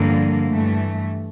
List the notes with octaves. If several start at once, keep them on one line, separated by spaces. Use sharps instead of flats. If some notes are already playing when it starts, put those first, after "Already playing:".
Already playing: G2 D3 F3 A#3
G2 E3 A3